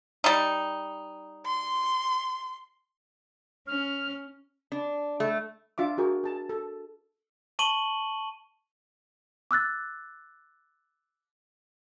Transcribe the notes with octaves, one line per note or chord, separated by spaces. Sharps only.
G3 D#4
C6
C#4 F6
D4
A3
D4 F4 E5 D6
F4 F#4 G#4 A#4
G#4 A5
A4
A5 C#6 D#7 F#7 G7
D6 E6 F#6 A6